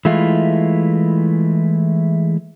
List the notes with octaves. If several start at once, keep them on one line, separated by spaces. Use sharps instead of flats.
E3 G#3 A3 E4 F4